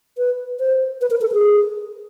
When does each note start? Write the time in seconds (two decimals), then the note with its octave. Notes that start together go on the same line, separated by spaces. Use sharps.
0.18 B4
0.60 C5
1.01 B4
1.10 A#4
1.21 A4
1.32 G#4